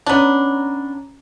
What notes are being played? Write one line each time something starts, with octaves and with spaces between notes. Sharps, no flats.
B3 C#4 D4 A#5 F#7